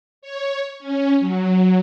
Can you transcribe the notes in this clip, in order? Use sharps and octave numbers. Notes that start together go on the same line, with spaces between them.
C#5
C#4
F#3